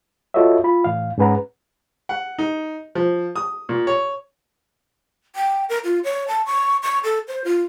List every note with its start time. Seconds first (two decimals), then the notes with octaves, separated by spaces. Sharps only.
0.34 F4 F#4 A4 C#5 D#5 E5
0.64 F4 B5
0.84 A2 E3 F5
1.18 G#2 C#4 G#4 B4 F#5 A#5
2.09 F#5
2.38 D#4
2.95 F3
3.36 D#6
3.69 A#2
3.87 C#5
5.36 G5
5.69 A#4
5.84 F4
6.04 C#5
6.28 A5
6.46 C#6
6.83 C#6
7.04 A4
7.28 C5
7.44 F4